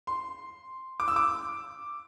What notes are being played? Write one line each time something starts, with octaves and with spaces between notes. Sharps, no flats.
C6
D6
E6
D6